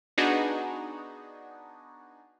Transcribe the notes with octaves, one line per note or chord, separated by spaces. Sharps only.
B3 D4 D#4 F#4 G#4